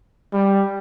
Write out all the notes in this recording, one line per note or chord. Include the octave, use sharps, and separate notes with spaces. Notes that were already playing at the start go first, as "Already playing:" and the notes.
G3